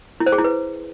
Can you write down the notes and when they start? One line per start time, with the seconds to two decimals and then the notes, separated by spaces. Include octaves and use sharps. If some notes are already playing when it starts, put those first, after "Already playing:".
0.20 E4
0.26 C5
0.32 G#4
0.38 E4
0.44 B4